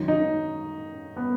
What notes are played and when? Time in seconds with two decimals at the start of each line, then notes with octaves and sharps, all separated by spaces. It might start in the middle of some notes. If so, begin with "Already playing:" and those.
Already playing: F#2 D#3
0.08 D#4
1.17 B3